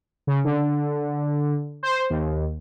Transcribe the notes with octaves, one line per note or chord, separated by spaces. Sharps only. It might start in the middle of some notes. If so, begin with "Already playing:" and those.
C#3
D3
C5
D#2